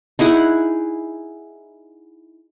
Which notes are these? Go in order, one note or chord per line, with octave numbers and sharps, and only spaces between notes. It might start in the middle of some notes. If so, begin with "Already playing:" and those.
D#4 E4 G#4 F#5